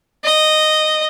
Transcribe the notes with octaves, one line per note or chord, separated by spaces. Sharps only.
D#5